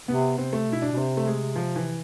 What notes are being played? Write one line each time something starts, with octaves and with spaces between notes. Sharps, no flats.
C3 B3
C3 C4
A3
B2 E4
D4
B2
C3 C4
A3
G#3
F3
E3